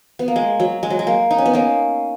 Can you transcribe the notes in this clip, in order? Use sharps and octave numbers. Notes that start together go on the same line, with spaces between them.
B3
A#3
G#3
F#3
G#3
F#3
G#3
A#3
D#4
C#4
B3
A#3 C#4